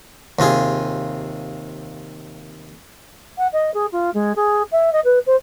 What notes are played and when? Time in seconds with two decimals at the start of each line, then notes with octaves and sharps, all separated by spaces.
0.39 D#2 C3 F4 G#4
3.38 F#5
3.53 D#5
3.74 G#4
3.92 F4
4.14 G#3
4.36 G#4
4.72 E5
4.93 D#5
5.05 B4
5.26 C5